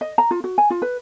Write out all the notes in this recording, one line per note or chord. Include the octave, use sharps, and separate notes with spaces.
D#5
A#5
F4
F#4
G#5
F4
B4